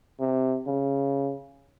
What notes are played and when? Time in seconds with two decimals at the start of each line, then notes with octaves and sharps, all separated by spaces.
0.19 C3
0.67 C#3